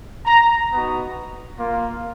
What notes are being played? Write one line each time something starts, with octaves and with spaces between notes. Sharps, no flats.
A#5
B3 D#4 F#4
A#3 F4